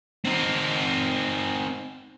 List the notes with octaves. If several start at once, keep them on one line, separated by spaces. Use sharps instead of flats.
C4 D#4